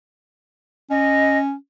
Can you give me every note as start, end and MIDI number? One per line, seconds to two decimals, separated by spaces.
0.90 1.54 61
0.90 1.37 75